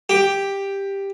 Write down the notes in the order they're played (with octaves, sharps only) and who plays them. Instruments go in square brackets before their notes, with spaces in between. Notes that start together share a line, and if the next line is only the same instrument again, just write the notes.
[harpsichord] G4